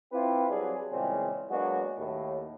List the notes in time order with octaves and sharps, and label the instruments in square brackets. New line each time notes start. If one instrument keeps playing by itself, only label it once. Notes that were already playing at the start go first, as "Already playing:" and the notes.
[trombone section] C4 E4 F4 G4 B4
F#3 G3 C4 D4 G#4
A#2 C#3 E3 G3 G#3 C4
F#3 G#3 A#3 B3 D4 F#4
D#2 A2